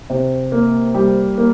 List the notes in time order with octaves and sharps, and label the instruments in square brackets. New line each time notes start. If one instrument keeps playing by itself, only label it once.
[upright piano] C3
A#3
G3
A#3